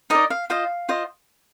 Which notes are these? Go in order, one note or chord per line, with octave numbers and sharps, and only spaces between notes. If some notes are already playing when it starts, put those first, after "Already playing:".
D#4 A#4 D5 D#5
F5
F4 C5 D#5 F5
F4 C5 D#5